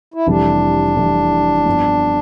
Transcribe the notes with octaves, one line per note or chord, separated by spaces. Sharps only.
E4
F1 F2 E3 G3 D4
F1 F2 E3 G3
G2 F3 B3